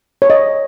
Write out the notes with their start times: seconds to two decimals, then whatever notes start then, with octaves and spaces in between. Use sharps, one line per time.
0.22 C#5
0.30 D#5